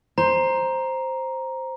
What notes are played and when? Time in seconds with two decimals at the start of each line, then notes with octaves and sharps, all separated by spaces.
0.18 C5 A#5